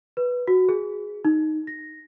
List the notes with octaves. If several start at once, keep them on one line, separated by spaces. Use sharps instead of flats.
B4
F#4
G#4
D#4
A#6